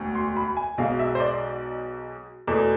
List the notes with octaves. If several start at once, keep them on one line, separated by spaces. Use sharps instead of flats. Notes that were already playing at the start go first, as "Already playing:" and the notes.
Already playing: E1 D2
C6
B5
G#5
B1 B2 G#3 F5
E5
C5
D5
E2 B2 A3